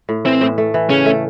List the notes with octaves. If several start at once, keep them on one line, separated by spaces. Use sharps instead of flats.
A2
E3 C4
A2
A3
E3
C#3 C#4
A3